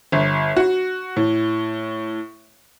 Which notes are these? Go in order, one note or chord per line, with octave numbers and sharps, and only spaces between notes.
G1
F#4
A2